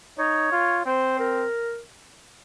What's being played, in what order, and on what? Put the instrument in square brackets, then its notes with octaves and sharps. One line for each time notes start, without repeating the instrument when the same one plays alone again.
[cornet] D#4 [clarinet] C#5
[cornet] F4
[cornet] C4 [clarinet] C5
[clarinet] A#4